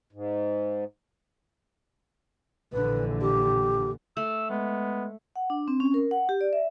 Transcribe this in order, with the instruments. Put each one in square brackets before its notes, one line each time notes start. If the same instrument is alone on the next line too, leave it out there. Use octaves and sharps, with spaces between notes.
[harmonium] G#2
[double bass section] A#1 D3 E3 [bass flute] B4
[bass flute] G4
[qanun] A3 [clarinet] E6
[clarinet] G#3 [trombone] B3
[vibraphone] F#5
D4
C4
C#4
A#4
F#5
G4
D5
E5